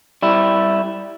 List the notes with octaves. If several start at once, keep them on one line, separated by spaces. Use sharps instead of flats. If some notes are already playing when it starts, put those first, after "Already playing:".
G3 E4